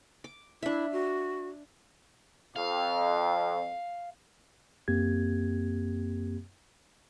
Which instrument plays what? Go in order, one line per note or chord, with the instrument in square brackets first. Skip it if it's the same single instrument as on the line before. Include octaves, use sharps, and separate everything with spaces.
[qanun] D6
[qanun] D4 E5 [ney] E4
[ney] F#4
[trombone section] F2 [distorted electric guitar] F5
[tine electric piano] F#2 A#3 C4 G4 G#6